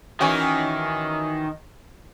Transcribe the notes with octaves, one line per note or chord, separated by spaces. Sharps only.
D#3 E3 C#4 F#4